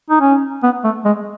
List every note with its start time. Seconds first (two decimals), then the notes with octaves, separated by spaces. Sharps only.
0.10 D#4
0.20 C#4
0.63 B3
0.84 A3
1.05 G#3